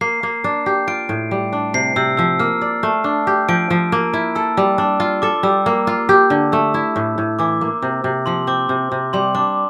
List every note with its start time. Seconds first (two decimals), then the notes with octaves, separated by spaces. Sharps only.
0.01 A#3 C7
0.23 A#3
0.44 D4
0.66 G4
0.87 F4 D7
1.09 A2
1.31 G3
1.53 D4
1.74 C3 C7
1.96 C3 E6
2.17 F3 E6
2.39 A#3 F6
2.61 D5
2.83 A3
3.04 D4
3.27 G4
3.49 F3 D7
3.70 F3
3.92 A#3
4.13 E4
4.35 A4 E6
4.57 G3
4.78 D4
5.00 F4
5.22 A4 D6
5.43 G3 E6
5.66 A#3
5.87 F4
6.09 G4
6.30 D3
6.52 A3 E6
6.74 E4
6.96 A2
7.18 A2
7.39 E3 D6
7.61 A#3
7.82 C3
8.04 C3
8.26 F3 C6
8.47 C4 D6
8.69 C3
8.92 C3
9.13 G3 C6
9.35 D4 D6